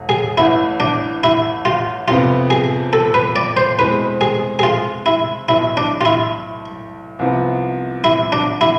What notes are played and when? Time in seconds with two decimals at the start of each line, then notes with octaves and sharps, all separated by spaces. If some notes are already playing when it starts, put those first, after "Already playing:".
Already playing: E1 D2
0.09 G#4
0.38 A1 A2 E3 E4
0.80 D4
1.24 E4
1.65 F4
2.08 F2 C3 F3 B3 F4
2.50 G#4
2.93 A4
3.14 B4
3.36 D5
3.57 C5
3.78 E2 B2 G#3 C4 B4
4.21 G#4
4.59 G#4
4.63 F4
5.06 E4
5.49 B1 A2 E3 E4
5.77 D4
6.01 F4
6.05 E4
7.19 C2 C3 F3 B3
8.04 E4
8.32 D4
8.61 E4